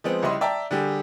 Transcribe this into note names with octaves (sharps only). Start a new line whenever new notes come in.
F3 G#3 B3 C4
C#2 G3 E4 D#5 B5 C6
D5 E5 G5 A5 A#5
D3 G3 G4 G#4